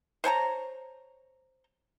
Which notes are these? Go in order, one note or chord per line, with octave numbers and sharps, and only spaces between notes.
C5 C#5 A5 A#5